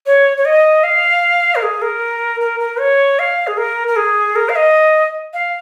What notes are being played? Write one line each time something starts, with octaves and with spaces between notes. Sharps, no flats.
C#5
C#5
D#5
F5
A#4
G#4
A#4
A#4
A#4
C#5
F5
G#4
A#4
A#4
G#4
A#4
F5
D#5
F5